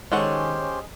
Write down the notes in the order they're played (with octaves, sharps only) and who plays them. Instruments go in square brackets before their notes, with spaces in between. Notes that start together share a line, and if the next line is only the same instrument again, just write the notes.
[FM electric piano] D#3 C#5 [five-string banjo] G#3 A4 F#5 [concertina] C#4 G4 C5